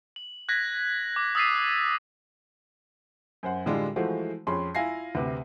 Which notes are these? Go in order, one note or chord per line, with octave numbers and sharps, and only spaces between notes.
F#7
F#6 G#6 A#6 B6
D6
D#6 E6 A6 B6 C7 D#7
F#2 C5 F#5
A2 D3 G3 G#3 D4 F4
E3 F3 G#3 A3 F#4 C5
F2 C#4 G#4 B5 C6
E4 F4 F5 G#5 A#6 C7
D2 C3 B4